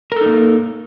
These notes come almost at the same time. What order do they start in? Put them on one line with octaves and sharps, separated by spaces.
A#4 A4 D#4 A#3